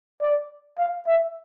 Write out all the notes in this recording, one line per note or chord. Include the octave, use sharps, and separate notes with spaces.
D5
F5
E5